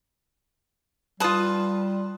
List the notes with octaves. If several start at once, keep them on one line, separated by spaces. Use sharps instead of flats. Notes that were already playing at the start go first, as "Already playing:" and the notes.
G3 F4 B4 A5 D#6